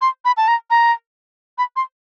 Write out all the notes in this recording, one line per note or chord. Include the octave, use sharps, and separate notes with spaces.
C6
B5
A5
A#5
A#5
B5
C6